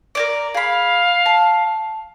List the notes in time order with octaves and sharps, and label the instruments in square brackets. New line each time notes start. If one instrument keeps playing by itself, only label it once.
[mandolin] A#4 C#5 D5
[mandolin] G#4 B5 [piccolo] F5
[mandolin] A5